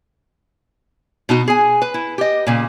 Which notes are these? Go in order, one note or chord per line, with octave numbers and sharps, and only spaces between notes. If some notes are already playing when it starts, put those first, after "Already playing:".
B2 D#4 F#4
G#4 G#5
B4
E4
G4 D#5
A#2 C#3